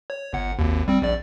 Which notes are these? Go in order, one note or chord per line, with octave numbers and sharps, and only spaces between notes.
C#5
G1 F#5
G#1 D#2
G3 C4
A#1 D5